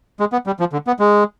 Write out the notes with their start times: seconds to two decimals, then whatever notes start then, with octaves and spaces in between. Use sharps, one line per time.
0.20 G#3
0.32 B3
0.47 G3
0.60 F3
0.73 D3
0.87 B3
0.99 G#3